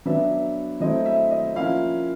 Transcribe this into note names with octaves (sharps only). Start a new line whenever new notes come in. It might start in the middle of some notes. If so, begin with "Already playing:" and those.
F#3 B3 D4 E5
F#3 A3 C4 E4 D#5
E5
D#5
F3 A#3 C#4 E4 F5